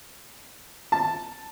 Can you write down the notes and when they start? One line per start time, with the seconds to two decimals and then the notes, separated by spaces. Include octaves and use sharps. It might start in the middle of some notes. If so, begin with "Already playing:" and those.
0.92 A5